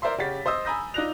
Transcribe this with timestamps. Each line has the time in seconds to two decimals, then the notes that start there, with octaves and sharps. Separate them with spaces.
0.02 A#4 C5 D5 E5 C6
0.18 C#3 C#4 G4 F#5 A6 B6
0.46 C5 D#5 D#6 E6
0.65 G#5 A#5 B5 D#6 G6 A#6
0.94 D#4 F4 D5 F#6 A#6 F7